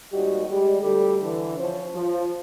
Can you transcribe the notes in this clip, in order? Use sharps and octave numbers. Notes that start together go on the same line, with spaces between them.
D#2 G#2 G3 F#4 G4 D#5
G3 G#3
D2 G3 A4
D3 E3
F3 C#4 C5
F3